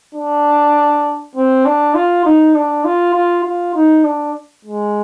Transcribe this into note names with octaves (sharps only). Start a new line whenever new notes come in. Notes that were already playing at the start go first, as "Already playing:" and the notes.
D4
C4
D4
F4
D#4
D4
F4
F4
F4
D#4
D4
G#3